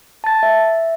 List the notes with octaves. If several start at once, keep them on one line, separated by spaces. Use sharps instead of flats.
A5 A6
E5